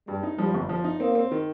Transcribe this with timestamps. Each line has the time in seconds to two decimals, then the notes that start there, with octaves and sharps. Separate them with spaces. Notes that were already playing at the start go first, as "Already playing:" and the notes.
0.08 G2 G3
0.23 D#4
0.38 F3 G3
0.54 G1
0.69 F3
0.84 D#4
1.00 A#3 C4
1.15 C4
1.31 D#3